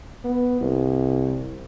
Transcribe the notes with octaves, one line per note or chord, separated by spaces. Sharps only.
B3
C2